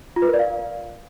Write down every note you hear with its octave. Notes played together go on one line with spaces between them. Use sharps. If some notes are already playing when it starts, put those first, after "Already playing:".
F4
B4
A#4
D5
F5